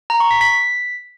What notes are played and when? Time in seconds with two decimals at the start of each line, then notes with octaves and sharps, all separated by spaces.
0.10 A#5
0.20 C#6
0.31 B6
0.41 B6